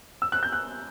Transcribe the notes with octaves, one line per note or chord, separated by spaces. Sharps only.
E6
F#6
G6
F#6